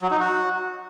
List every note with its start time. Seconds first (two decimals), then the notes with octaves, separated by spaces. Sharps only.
0.02 F#3
0.11 D#4
0.20 F#4